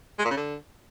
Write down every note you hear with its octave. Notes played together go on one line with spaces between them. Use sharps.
G#3
A#2
C#3
D3